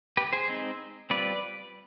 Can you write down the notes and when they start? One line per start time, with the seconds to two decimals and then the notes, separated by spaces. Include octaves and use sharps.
0.17 G4 B4
0.33 G#4 C5
0.48 G#3 C4 D#4
1.10 G3 C4 F4 B4 D5